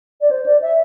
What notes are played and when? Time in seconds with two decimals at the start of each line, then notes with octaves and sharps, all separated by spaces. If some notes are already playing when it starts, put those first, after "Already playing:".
0.21 D5
0.30 C5
0.46 D5
0.62 E5